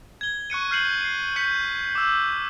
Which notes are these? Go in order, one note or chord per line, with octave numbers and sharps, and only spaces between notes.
G#6 G7
C#6 F#6 C#7 D#7
F6 G6 C7 C#7 F#7
C7 D#7
G6 B6 C#7 F#7
D6 E6